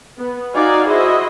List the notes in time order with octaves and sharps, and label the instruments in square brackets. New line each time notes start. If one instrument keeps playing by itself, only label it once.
[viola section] B3
D#4 F#4 D5 F5 G#5
E4 F#4 G#4 C5 D#5 E5